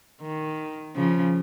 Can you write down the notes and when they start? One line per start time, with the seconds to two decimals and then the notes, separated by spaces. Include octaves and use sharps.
0.21 D#3
0.96 C#3 F3